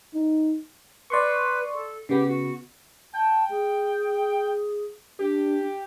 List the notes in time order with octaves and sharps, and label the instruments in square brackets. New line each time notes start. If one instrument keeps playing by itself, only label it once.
[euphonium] D#4
[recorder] B4 [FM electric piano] D5 C6 C#6
[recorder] A4
[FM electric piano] C#3 B3 [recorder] G4
[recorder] F#4
[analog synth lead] G5 [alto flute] A5
[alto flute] G#4
[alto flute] D4 [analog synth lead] G4